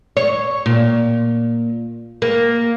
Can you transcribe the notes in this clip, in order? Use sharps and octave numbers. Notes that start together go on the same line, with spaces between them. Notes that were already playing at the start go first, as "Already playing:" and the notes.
C#5
A#2
A#3